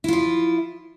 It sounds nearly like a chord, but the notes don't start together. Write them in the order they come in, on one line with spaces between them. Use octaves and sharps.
E4 F4 F3